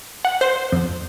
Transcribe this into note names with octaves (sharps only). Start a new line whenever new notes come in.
F#5
C5
F2